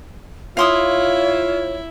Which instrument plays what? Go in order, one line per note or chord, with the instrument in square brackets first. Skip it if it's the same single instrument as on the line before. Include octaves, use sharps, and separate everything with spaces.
[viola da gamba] E4 [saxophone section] F4 [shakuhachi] C#5 [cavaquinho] F5 C6 D#6